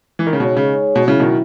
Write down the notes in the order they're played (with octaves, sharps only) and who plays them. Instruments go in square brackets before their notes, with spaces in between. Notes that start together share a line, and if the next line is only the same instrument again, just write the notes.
[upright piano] E3
D#3
C#3
[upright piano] B2 [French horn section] G#3 D#4 G#4 C#5
[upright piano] C#3
B2
[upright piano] C#3 [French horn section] F#3 C#4 E4
[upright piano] B2 D#3